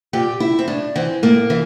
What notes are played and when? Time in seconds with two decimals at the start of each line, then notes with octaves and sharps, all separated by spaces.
0.13 A#2 G4
0.40 E4
0.59 C4
0.68 A2 D4
0.96 E3 C4
1.23 A2 A#3
1.50 E3